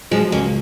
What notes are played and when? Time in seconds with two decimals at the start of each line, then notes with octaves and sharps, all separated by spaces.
0.11 F3 F#3 G#3
0.32 C#2 A#3 C#4